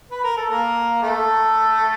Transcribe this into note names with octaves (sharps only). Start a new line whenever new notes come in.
B4
A#4
A4
A#3 A#4
A3 A4